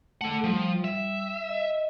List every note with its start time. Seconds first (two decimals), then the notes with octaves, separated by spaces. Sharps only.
0.21 A3 A4 F#5
0.44 F3 G3
0.84 E5
1.49 D#5